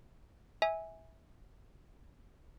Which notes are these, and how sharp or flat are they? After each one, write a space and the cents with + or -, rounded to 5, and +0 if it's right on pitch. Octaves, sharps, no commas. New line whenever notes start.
E5 -20 G#5 -5